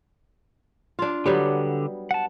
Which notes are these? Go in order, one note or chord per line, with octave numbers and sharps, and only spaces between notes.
D4 F4
D3 F#3 G3 B3 G4
F#5 A5